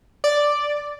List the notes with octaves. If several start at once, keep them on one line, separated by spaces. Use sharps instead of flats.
D5